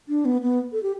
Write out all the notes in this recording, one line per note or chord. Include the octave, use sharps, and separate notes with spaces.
D4
B3
B3
A4
G4